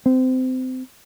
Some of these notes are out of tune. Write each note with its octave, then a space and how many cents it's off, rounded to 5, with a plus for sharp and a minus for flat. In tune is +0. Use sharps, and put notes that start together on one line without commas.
C4 -25